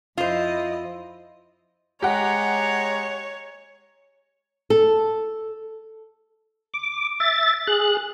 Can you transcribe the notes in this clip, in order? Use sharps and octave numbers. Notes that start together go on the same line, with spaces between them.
F2 E4 F4 C5 D#5
G#3 G4 C#5 F#5 A#5
A4
D6
E5 A6
G#4 F#6